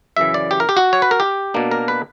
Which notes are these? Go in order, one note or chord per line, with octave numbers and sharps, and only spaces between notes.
F#2 C#3 E3 E5
D5
G4
A#4
G4
F#4
C#5
B4
A#4
G4
B2 A#3 D4
A#4
B4